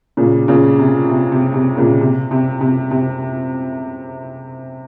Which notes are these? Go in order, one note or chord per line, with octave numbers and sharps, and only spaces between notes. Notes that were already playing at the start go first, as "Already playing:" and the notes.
A#2 C#3
A#2 C#3
C3
C3
C3
C3
A#2 C#3
C3
C3
C3
C3